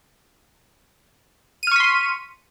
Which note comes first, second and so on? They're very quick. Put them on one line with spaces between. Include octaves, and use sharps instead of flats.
D#7 F6 C#6 B6 C6